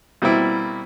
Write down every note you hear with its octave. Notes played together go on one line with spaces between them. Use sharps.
B2 G3 A#3 C4 E4